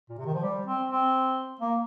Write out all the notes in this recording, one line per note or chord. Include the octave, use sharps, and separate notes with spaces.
A#2
C3
D#3
F3
G3
C4
C4
A#3